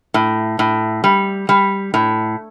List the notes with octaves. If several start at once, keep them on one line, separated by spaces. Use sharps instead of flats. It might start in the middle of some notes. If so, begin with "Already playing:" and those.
A2
A2
G3
G3
A2